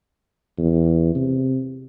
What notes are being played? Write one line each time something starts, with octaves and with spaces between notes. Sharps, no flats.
E2
C3